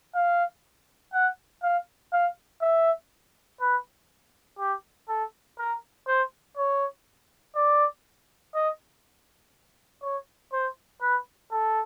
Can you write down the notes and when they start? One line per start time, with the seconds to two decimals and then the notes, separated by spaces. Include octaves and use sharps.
0.15 F5
1.13 F#5
1.63 F5
2.13 F5
2.62 E5
3.61 B4
4.59 G4
5.09 A4
5.59 A#4
6.07 C5
6.57 C#5
7.56 D5
8.55 D#5
10.02 C#5
10.52 C5
11.01 B4
11.51 A4